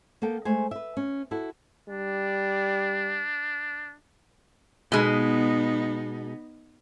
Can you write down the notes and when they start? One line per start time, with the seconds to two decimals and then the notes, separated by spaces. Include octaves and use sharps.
0.22 A#3 B3 A4 G5
0.45 G#3 A3 C5 G#5
0.71 B4 E5
0.97 C#4
1.31 E4 F#4 A4
1.89 G3 D4
4.92 B2 G#3 B3 D#4